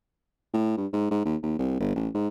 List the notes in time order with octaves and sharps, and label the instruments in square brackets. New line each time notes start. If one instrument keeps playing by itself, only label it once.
[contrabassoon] A2
G2
G#2
G#2
D#2
D#2
C2
G1
A1
G#2